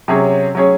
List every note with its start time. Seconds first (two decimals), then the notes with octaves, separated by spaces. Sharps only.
0.08 C3 F#3 C#4 G#4 C#5
0.55 F#3 C#4 G#4 C#5